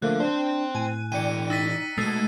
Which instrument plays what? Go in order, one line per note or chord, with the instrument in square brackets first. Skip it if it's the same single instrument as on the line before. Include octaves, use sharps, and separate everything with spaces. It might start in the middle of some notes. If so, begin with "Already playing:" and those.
[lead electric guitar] D3 [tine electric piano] F3 A3 A#3 [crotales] F#6
[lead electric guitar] C4 C5 [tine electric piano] D4
[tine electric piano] A2 [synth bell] G#5 D#7
[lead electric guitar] B2 E3 [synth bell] D5 G5 [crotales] C#7 D#7
[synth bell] D#4 [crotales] E6 A6 B6
[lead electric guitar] B2 [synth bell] G#3 A3 G#6 [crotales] C7 D#7